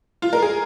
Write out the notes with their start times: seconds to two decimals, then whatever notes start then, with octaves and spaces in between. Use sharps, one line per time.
0.22 F4
0.33 A#4
0.42 G#4